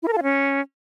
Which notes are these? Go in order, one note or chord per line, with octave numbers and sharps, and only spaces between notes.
E4
A#4
A4
F4
C#4